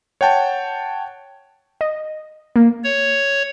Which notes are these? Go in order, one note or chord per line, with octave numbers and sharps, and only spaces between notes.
C#5 F#5 G5 A5
D#5
A#3
C#5